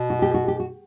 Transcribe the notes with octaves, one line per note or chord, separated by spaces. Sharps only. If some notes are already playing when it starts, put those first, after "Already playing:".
Already playing: B2
F#4
G4
F#4
G4
F#4